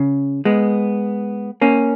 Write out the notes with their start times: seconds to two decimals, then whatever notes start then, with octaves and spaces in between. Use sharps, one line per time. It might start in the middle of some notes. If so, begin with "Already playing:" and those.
Already playing: C#3
0.45 G#3 B3
1.61 A#3 C#4